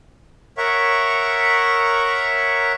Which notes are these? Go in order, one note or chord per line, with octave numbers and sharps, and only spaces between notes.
A#4 C#5 E5 F#5 C#6